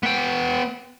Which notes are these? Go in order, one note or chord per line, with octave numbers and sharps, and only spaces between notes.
B3 G5